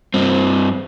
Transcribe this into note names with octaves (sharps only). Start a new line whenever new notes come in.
G2 C4